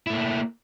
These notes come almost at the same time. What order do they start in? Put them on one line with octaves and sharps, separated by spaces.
E4 A3 A#3